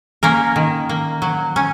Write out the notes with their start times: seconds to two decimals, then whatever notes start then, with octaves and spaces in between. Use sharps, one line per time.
0.23 A#3 C#4 A#4
0.56 D#3
0.89 A#3
1.22 F#3
1.56 C#4